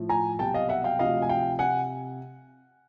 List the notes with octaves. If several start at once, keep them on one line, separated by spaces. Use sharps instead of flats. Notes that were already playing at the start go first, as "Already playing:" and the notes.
Already playing: A2 F3
G#5 A#5
C2 B2 F#3 G5 A5
D#5 F5
E5 F#5
F5 G5
D2 C3 F3 D#5 F5
G#5
F5 G5
C3 F#5 G#5